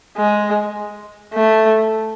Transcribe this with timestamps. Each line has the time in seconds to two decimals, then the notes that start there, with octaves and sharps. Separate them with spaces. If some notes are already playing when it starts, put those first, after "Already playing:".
0.17 G#3
1.33 A3